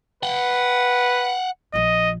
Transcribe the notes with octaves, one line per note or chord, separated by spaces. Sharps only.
B4 F#5 G5
A#1 F3 D#5